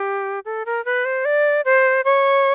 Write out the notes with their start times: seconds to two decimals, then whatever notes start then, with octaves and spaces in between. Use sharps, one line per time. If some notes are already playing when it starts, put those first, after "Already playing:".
Already playing: G4
0.45 A4
0.66 A#4
0.85 B4
1.05 C5
1.25 D5
1.65 C5
2.05 C#5